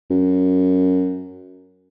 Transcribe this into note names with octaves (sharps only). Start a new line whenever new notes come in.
F#2